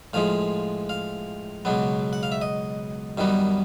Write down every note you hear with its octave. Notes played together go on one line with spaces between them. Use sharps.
A2 F3 G#3 F5
F5
C#2 B2 F#3 B3
F#5
F5
E5
D#5
F#2 D#3 G3 B3